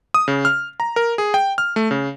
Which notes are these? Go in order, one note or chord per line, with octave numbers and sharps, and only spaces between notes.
D#6
C#3
F6
A#5
A#4
G#4
G5
F6
A3
C#3